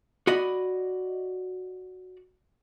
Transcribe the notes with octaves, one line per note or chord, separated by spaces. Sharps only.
F#4 D5 D#5 B5